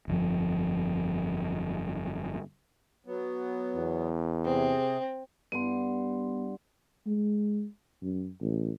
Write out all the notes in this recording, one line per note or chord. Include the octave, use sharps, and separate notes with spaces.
G1 F2 C#3 F3
F#3 B3
E2
C3 C4 G#4
G2 B3 F#5 C6
G#3
F#2
A1